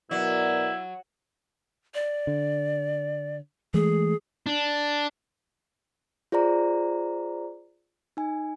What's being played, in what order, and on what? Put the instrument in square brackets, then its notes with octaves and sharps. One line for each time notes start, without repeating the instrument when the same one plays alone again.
[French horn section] B2 A#4 D5 [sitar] F#3 [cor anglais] E4
[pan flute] D5
[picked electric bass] D3
[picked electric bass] E3 G#3 A3 [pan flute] G#4
[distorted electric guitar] D4
[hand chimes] F4 G#4 C5 D5 A#5
D#4 G#5